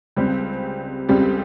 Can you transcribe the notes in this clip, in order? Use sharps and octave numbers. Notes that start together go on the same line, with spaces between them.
C#2 C#3 G3 C4 G4
C#2 C#3 G3 C4 G4